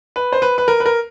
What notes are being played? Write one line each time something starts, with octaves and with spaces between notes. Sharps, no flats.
B4
C5
B4
B4
A#4
B4
A#4